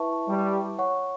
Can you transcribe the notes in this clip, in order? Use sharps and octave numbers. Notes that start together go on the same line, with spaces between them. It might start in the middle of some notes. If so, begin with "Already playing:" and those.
Already playing: E4 B4 E5 A5 C#6
G3
C#5 F#5 C#6